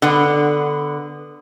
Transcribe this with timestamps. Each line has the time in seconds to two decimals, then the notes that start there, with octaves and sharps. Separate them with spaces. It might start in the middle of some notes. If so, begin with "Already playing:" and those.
0.02 D3 B3